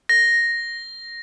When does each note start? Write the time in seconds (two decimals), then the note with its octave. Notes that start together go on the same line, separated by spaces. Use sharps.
0.09 A#6